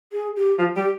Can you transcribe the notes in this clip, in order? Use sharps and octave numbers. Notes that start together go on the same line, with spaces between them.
G#4
G4
F3
G3 G4